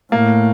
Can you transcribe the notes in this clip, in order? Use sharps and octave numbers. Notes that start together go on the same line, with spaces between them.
A2 A#3